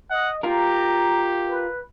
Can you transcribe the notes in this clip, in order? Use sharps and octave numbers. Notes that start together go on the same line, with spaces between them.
D#5 F#5
F4 G4 A#4 A#5
B4